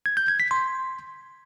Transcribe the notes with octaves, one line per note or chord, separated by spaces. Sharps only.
G#6
G6
G#6
B6
C6